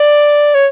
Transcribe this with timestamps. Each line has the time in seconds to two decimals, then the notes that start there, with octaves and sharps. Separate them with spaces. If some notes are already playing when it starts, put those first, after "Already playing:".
Already playing: D5
0.54 C#5